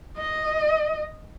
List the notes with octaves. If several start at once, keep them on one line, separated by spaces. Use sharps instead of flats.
D#5